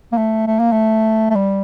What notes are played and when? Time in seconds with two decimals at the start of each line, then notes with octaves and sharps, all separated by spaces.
0.12 A#3
0.17 A3
0.47 A3
0.59 A#3
0.72 A3
1.30 A3
1.35 G3